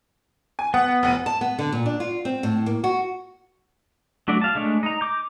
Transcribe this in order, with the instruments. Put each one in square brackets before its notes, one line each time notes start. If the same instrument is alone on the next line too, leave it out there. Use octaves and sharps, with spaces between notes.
[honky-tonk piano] G#5
[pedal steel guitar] B3 [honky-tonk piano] F#5
[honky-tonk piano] F1 F#5 D#7
[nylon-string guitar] A5
B3
D3
A#2
D4
F4
C4
A2
A#3
F#4
[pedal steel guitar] F#3 A3 D4 F#4 D5
F5 A5
G#3 A3 D4 C#5
D#4 A#5
D6 G6